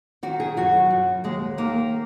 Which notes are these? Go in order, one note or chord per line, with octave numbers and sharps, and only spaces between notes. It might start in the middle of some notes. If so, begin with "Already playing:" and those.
D#3 F#4
G#4
F#2 F#4
F#2
D#2 G#3
D#3 A#3